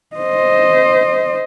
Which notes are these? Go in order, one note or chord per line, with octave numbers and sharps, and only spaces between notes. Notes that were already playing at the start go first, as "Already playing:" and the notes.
C5 D#5